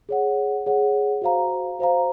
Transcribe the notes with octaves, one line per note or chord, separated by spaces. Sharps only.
G#4 C#5 F#5
G#4 C#5 F#5
F#4 C5 F5 A#5
F#4 C5 F5 A#5